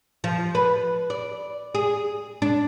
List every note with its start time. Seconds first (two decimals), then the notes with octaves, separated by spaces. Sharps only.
0.24 F3
0.55 B4
1.10 D5
1.75 G#4
2.42 D4